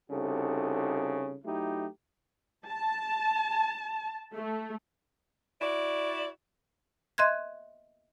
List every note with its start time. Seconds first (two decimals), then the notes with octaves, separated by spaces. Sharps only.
0.10 C2 C#3 D#4 F#4 A4
1.45 F#3 A3 D#4 E4 G4
2.67 A5
4.35 A3
5.61 E4 F#4 D5
7.18 D#5 E5 C6 F#6 G#6